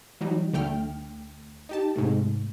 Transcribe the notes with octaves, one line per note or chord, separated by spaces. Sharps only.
E3 F#3 G3 D#4
D2 D3 A3 G5 F6
D#4 G4 A5
G#2 C3 A3